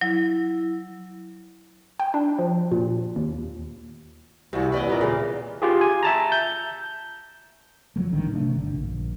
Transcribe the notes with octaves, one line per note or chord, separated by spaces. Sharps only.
F#3 E4
G5
D4
F3
A#2
D#2
C2 C3 E3 A3 F4 F#4
D#2 B4 D5 D#5
A#2 B3 A#4
C#3 E3 A#3
F4 G4 G#4
G#5
E5 A5 A#5
G6
F3 F#3 A3
A#1 A2 D3 D#3
C3 A3 D4
G1 D3
A#1